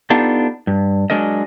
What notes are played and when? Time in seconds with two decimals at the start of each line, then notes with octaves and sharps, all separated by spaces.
0.10 B3 D4 D#4 F4 G4 A4
0.67 G2
1.10 F#3 G#3 D4 A#4 D#5